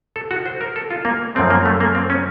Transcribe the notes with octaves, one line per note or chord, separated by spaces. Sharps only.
A4
F#4
C5
A#4
A4
F4
A#3
F#2 F3 A3 C4
A#3
A3
A#3
C4
C#4